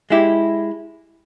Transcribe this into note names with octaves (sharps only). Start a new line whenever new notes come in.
G#3 E4 G4